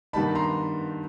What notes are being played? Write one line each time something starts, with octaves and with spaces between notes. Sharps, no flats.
G2 D#3 G3 B3 D#4 A5 B5
A#5 C6